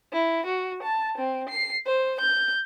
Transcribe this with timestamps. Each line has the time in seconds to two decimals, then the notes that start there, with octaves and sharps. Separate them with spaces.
0.13 E4
0.46 F#4
0.83 A5
1.18 C4
1.49 C7
1.86 C5
2.20 G6